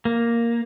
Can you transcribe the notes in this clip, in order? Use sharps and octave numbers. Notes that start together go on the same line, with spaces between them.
A#3